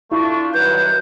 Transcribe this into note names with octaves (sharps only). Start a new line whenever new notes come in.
A3 D4 E4 F4 C#6
G2 D#3 F#3 B4 G6